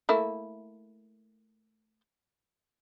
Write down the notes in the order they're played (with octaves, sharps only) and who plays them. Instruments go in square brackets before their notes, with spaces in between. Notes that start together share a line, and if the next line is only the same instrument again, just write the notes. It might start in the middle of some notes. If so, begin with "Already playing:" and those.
[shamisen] A3 A#3 E4